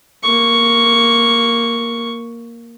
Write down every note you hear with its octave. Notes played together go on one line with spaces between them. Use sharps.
A#3 C#6